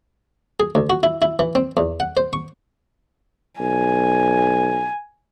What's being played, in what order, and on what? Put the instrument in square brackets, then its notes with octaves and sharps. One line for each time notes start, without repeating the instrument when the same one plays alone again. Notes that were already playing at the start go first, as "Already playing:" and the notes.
[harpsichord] G#4
D2
F#4
E4
E4
E3
C4
E2
F#5
C5
C#6
[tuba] B1 [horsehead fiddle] G#5